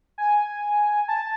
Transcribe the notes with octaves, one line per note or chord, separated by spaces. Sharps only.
G#5
A5